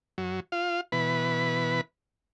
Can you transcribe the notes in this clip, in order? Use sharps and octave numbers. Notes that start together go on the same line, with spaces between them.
F#2 F#3
F4 F5
B2 E3 B4 B5